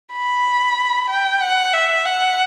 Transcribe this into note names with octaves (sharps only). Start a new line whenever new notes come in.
B5
G5
F#5
E5
F#5